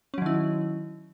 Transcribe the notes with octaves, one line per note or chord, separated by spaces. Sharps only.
D#3 F#3 C#4 E4